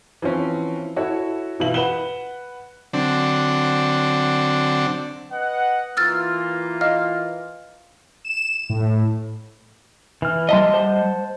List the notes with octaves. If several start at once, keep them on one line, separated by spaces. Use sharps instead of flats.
E3 F3 C4 C#4
E4 F#4 A4 C#5
B2 E3 F4 E5 F#7
B4 F#5 E7 G7
D3 F#3 C4 D4
B4 D#5 F#5
E3 A#3 F4 E6 F6 A6
D#5 F5 F6
E7
A2
E3 F6
G3 D#5 E5 A5 C6
C5 F#5 A5